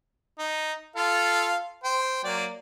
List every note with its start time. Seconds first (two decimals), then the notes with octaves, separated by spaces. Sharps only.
0.39 D#4
0.96 F4 A4 F5
1.84 C5 G5
2.24 F#3 A#3 D5